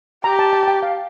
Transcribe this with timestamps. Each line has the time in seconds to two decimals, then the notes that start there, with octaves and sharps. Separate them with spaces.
0.24 G4 A#5
0.39 A5
0.53 A5
0.63 A5
0.68 G5
0.83 F5